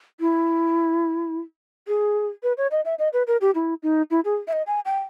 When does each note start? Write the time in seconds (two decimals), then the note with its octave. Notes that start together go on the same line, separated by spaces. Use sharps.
0.20 E4
1.87 G#4
2.43 B4
2.57 C#5
2.71 D#5
2.85 E5
2.99 D#5
3.13 B4
3.27 A#4
3.41 G4
3.55 E4
3.83 D#4
4.10 E4
4.25 G#4
4.47 E5
4.53 D#5
4.67 G#5
4.85 G5